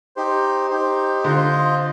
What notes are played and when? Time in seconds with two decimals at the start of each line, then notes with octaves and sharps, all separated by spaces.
0.16 D#4 G4 C5
0.70 D#4 G4 C5
1.24 D3 F4 C5 D#5